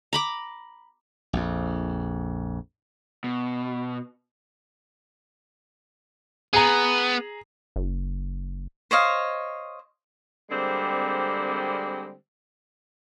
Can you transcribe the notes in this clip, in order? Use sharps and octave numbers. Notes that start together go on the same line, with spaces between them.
A#5 B5 D6
A#1 F2
B2
B3 G#4 A#5
F#1
C5 C#5 D#5 F5
D3 G3 G#3 A#3 C4